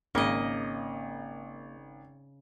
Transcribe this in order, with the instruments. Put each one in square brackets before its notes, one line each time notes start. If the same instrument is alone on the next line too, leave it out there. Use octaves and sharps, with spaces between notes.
[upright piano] G#1 [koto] C#3 D#5 [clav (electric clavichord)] A#3